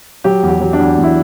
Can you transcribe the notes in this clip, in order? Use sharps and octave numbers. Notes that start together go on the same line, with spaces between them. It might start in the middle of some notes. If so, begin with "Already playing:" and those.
F#3 G4
E2
G4
F#3
D4
E2
E2
E4